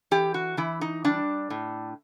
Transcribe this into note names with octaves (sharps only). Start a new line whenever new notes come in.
E3 G4
F#4
E3 E4
D#4
G3 D4
A2